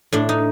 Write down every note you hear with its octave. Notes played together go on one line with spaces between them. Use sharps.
A2 D4
D#4